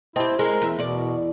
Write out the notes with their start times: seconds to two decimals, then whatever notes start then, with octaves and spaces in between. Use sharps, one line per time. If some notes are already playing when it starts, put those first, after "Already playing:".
0.16 C4 E4 G4 D#5 G5 A5
0.39 G#3 G#4 A#4
0.62 E2 E5
0.79 E2 B2 D5